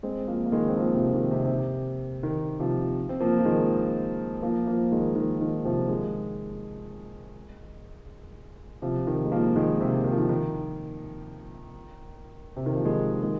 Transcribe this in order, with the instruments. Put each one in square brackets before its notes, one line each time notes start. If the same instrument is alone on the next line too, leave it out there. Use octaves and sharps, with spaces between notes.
[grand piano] G#3 C4
F3 A#3
A#3
D#3 G#3
C4
F3 A#3
C3 F3
D#3
C3
C3
D#3
C3 F3
C4
F3 A#3
F3
D#3 G#3
F3 A#3
F3 A#3
D#3 G#3
D#3
D#3
C3 F3
D#3 G#3
C3 F3
D#3
G#3
F3 A#3
D#3 G#3
C3
D#3
F3
D#3
D#3
C3
D#3
F3
D#3 G#3
D#3 G#3